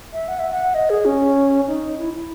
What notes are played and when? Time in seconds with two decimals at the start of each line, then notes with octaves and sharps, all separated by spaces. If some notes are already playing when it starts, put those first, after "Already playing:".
0.13 E5
0.28 F#5
0.39 E5
0.51 F#5
0.74 D#5
0.90 G#4
1.05 C#4
1.67 D#4
1.99 E4
2.14 E4